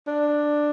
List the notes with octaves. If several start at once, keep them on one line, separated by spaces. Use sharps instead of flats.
D4